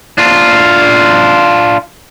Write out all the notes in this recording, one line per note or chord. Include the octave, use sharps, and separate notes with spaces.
D4 F4